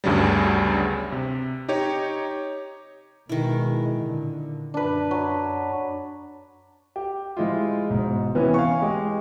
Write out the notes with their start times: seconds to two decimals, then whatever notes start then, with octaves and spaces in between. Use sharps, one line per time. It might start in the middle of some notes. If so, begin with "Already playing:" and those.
0.04 G1 D2 G2 C#3 F#3 G3
1.12 C3
1.69 D#4 G4 C#5
3.29 B2 D#3 G#3 E4
3.94 A#2 D3
4.74 F#2 D4 B4
5.11 F#3
6.96 G4
7.37 F3 G#3 E4 F4
7.90 E1 G#2
8.35 C3 E3 B3 C#4
8.54 F5 G#5 C#6
8.82 G#3 G4